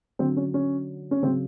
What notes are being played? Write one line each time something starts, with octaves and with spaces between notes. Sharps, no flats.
D3 F#3 C4
C#4
C#4
C#4
C#3 F#3 C4